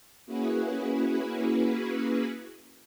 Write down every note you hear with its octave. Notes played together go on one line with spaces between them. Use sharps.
A#3 C#4 E4 F#4 G#4 B4